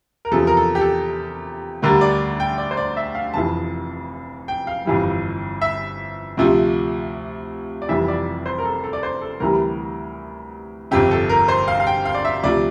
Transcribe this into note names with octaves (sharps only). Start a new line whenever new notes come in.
A#4
E2 C3 F3 A4
A#4
A4
G4
A4
D2 D3 G3 A#4
D5
G5
D5
C5
D5
E5
F5
F1 F2 E3 A5
G5
F5
G1 F2 E3 G3
E5
D2 C3 F3
D5
F1 F2 E3 G3 E5
D5
C5
A#4
A4
A4
D5
C5
A4
D2 C3 E3 G3 A#4
G1 F2 C3 G4
A4
A#4
C5
F5
F5
G5
F5
D5
E5
D2 C3 F3 D5